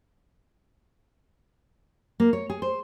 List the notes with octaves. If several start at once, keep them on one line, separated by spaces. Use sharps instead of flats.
A#3
C#5
G#4
C5